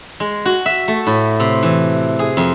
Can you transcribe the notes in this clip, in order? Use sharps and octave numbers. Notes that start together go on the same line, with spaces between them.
G#3
F#4
E5
A3
A2
C3
E3
G#4
F2